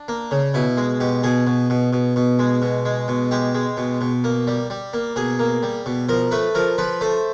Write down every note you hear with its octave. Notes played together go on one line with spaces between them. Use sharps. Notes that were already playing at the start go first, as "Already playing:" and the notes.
Already playing: D4
A#3
C#3
B2 E4
G#3
B2 G4
B2 G#4
B2
B2
B2
B2
G#3
B2
G#3
B2
G#3 G4
G#3
B2
B2
A#3
G3
G3
A#3
B2 G#4
A#3
G3
B2
F3 A#4
A3 B4
F3 A#4
F3 B4
A3 C5